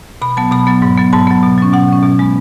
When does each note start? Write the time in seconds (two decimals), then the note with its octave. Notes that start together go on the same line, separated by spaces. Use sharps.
0.22 B2 B5
0.37 F#3 B3 A5
0.52 B2 B5
0.67 F#3 B3
0.82 G#2
0.98 F#3 B3
1.13 G#2 A5
1.27 F#3 B3
1.43 B2
1.58 F#3 C#4
1.73 B2 F#5
1.89 F#3 C#4
2.03 B2
2.19 G#3 B3